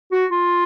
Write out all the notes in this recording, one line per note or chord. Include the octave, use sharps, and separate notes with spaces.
F#4
F4